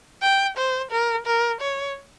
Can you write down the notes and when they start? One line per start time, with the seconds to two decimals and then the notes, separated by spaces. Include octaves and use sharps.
0.22 G5
0.57 C5
0.91 A#4
1.27 A#4
1.61 C#5